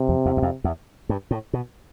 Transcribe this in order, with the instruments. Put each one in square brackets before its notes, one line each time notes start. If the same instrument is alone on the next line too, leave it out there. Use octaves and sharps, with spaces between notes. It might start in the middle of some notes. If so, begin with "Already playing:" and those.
Already playing: [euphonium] C3
[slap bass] F2
E2
E2
F2
E2
G2
A2
B2